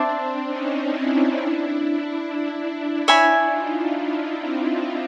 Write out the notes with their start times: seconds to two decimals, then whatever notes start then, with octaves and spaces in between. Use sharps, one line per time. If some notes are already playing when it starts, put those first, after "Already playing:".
Already playing: C4 D4 C5 E5 A5 D6
0.49 C#4 D#4
0.92 D4 E4
3.08 D4 E4 C#5 E5 G#5 B5
3.51 D#4 F4
3.94 D4 E4
4.37 C4 D4